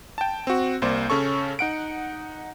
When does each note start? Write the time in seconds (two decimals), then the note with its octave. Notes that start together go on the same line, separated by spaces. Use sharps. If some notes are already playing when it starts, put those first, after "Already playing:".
0.18 G5 A5
0.47 C4 F#4
0.82 C2 A#3 C5 D5
1.10 C#3 C#4 A4 C#6
1.59 D#4 F#5 D7